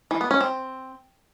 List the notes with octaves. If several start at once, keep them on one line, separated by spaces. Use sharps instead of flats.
E3
B3
C#4
C4